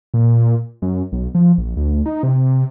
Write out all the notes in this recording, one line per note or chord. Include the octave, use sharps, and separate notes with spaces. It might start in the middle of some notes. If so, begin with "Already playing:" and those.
A#2
F#2
B1
F3
A#1
D2
D#4
C3